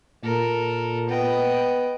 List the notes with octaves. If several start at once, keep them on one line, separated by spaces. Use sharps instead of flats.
A#2 A4 A#4
B3 D#5 G5